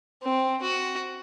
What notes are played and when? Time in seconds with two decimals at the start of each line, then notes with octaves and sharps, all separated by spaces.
0.23 C4
0.62 F#4